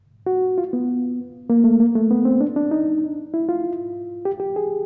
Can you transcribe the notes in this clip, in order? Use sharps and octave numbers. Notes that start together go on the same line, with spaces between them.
F#4
F4
B3
A#3
A3
A#3
A3
B3
C4
D4
D4
D#4
E4
F4
G4
G4
G#4